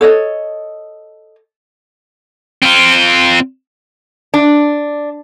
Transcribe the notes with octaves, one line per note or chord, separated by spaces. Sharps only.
A4 C#5 D#5
C4 F4
D4